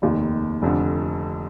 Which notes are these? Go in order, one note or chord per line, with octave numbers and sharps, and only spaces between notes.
F1 D#2 D#3
F1 F2 D3